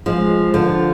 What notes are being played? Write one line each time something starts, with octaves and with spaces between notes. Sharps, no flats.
F3 G#3
D3 F3